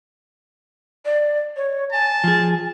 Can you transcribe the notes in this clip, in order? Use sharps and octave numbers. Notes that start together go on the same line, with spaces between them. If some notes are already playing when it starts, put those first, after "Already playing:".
D5
C#5
G#5 A5
F3 G#4